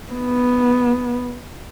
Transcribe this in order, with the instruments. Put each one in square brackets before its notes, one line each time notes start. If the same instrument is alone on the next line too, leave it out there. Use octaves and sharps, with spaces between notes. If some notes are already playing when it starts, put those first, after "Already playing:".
[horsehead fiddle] B3